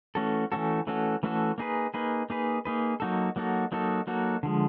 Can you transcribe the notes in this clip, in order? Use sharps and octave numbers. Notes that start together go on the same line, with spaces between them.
E3 A3 C#4 F#4 A4
E3 A3 C#4 F#4 A4
E3 A3 C#4 F#4 A4
E3 A3 C#4 F#4 A4
A#3 D#4 G#4 B4
A#3 D#4 G#4 B4
A#3 D#4 G#4 B4
A#3 D#4 G#4 B4
F#3 A#3 D#4 F#4 A4
F#3 A#3 D#4 F#4 A4
F#3 A#3 D#4 F#4 A4
F#3 A#3 D#4 F#4 A4
D3 F3 G#3